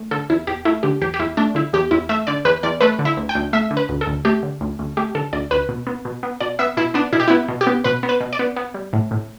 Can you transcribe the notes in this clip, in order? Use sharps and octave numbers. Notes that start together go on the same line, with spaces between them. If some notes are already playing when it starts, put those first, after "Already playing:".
Already playing: A3
D3 A4
E2 E4
E2 G4
A3 E4
D3 G4
E2 G4
G4
E2 E4
A3 D4
D3 E4
E2 G4
E2 E4
A3 E5
D3 D5
E2 B4
E2 D5
A3 B4
D3
E4
D2
G5
D2
A3 E5
D3
B4
D2
A4
D2
A3 G4
D3
D2
D2
A3 G4
D3 A4
D2 D5
D2 B4
B2
B3
B2
B3
B2 D5
B3 E5
B2 E4
B3 D4
B2 E4
G4
E4
B3
B2
G4
B3
B2 B4
B3
B4
B2
D5
B3
B3
G3
A2
A2